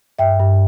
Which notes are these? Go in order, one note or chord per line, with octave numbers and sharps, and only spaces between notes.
G2 E5 G5
G2